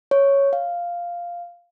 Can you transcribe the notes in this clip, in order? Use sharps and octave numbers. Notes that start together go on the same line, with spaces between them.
C#5
F5